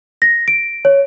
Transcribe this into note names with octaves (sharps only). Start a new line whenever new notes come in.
A#6
D7
C#5